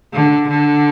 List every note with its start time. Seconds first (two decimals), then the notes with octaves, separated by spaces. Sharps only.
0.13 D3
0.49 D3